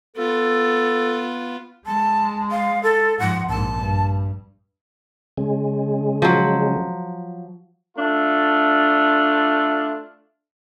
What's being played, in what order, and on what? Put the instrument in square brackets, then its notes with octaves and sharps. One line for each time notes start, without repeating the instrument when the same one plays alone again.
[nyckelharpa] B3 F4 [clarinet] A4
[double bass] G#3 [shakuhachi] A5
[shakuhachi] F5
A4
[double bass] G#2 F3 [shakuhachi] F#5
[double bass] A#1 G#2 [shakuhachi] A5
[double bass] G2
[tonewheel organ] C#3 G#3
[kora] F3 F#3
[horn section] A3 D4 F4